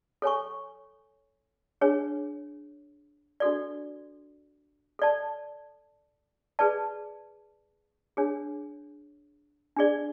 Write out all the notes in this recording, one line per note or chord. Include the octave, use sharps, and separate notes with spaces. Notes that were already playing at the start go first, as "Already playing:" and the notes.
A4 C#5 G#5 C#6
D4 G#4 C#5
D4 F#4 A4 D5
A4 D5 A5
G#4 B4 D5 A5
D4 G#4 C#5
D4 G#4 D5